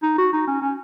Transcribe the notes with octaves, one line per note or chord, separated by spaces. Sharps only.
D#4
F#4
D#4
C#4
C#4